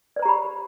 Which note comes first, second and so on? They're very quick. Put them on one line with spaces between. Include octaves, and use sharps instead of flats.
D5 C5 A#5 G4 B5